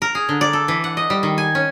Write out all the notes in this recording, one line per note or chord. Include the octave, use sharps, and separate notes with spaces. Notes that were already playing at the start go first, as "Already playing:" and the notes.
A#4
G#4
D3
D5
A4
E3
F#5
D#5
G3
D#3
G#5
C#4